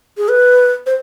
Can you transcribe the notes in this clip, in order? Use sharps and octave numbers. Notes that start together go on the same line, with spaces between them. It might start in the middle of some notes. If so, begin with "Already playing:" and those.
G#4
B4
C5